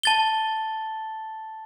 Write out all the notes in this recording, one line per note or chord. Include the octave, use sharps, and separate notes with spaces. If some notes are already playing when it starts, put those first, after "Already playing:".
A5 A6 G7